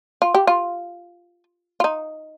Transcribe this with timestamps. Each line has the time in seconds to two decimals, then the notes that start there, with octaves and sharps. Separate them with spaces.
0.22 F4
0.35 G4
0.47 F4
1.80 F4
1.84 D#4